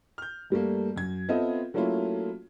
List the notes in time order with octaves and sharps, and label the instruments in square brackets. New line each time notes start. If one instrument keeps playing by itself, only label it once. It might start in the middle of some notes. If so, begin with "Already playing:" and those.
[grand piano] F6 G6
G2 G3 A3 A#3
F#2 G#6
B3 C4 F4 A4 D#5 E5
F#3 A3 A#3 C#4 E4 F4